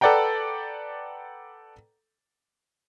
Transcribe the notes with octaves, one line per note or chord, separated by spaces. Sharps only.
A4 B4 D5 F#5 G5 A#5